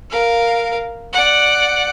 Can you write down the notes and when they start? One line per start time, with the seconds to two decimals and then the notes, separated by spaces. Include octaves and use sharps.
0.10 A#4 F5
1.13 D5 F#5